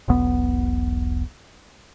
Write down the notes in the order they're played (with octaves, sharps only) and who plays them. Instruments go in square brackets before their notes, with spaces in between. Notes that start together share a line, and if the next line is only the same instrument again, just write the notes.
[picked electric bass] E1 B1 B3